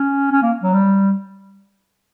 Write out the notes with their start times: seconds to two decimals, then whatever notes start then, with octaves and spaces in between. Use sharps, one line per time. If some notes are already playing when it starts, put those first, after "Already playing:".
Already playing: C#4
0.31 C#4
0.42 A#3
0.63 F#3
0.73 G3